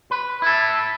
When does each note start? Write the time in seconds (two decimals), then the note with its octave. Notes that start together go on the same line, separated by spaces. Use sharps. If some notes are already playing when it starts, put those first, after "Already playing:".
0.11 B4
0.42 E4 A4